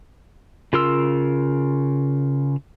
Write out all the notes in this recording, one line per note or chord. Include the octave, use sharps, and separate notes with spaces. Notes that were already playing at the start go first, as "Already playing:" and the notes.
C#3 F4 A#4 C6 E6